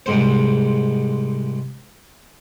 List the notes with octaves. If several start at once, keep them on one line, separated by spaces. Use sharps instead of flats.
C2 G#2 C5